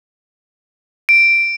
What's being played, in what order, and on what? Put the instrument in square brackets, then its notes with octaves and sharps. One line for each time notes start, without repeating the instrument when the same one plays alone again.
[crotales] D7